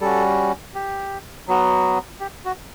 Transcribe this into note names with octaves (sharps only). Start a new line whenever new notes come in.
G3 C#4 F#4 A4
G4
F#3 B3 F#4
G4
F#4